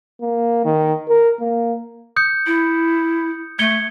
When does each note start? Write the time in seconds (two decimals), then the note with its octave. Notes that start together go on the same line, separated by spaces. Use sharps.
0.21 A#3
0.65 D#3
1.09 A#4
1.40 A#3
2.16 D#6 G6 C#7
2.46 E4
3.59 A3 G#6 C#7 G7